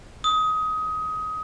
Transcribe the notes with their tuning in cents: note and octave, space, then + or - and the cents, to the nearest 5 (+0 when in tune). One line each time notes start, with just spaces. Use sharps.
D#6 +20